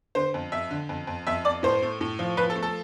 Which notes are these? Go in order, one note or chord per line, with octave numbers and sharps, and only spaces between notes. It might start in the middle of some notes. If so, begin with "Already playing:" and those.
D3 C5
F2
F2 E5
D3
F2
F2
F2 E5
F2 D5
A2 C5
A3
A2
F3
F3 B4
A4
A3
A4